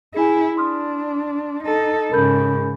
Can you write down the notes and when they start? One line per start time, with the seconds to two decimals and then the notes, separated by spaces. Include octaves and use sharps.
0.14 E4 G#4 G#5
0.57 D4 C6 D#6 F6
1.63 D#4 A4
2.12 G#2 C#3 A#4 B5 G6